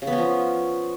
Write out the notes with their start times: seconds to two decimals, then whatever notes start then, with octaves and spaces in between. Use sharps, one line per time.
0.02 C#3
0.07 B3
0.13 C#4
0.18 F3